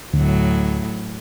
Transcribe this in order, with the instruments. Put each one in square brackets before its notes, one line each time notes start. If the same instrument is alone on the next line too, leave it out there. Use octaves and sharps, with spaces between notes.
[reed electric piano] D2 [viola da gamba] A2 F#3